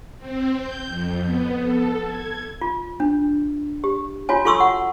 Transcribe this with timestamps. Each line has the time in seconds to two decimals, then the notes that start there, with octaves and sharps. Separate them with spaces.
0.18 C4
0.57 G6
0.87 F2
1.23 B3
1.60 A4
2.04 G#6
2.61 F4
3.00 D4
3.84 G4
4.29 F4 F#4 C#5 G#5
4.45 F4 A4 C6 C#6 D#6 E6
4.60 F#5